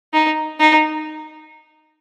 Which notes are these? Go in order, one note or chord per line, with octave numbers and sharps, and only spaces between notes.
D#4
D#4